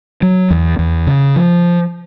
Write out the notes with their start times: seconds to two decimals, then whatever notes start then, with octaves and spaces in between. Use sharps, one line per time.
0.22 F#3
0.51 E2
0.79 E2
1.07 C#3
1.36 F3